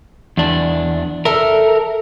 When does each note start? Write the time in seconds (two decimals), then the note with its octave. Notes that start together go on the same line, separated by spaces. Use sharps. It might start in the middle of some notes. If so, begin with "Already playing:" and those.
0.37 E2 D4
1.25 A4 A#4 E5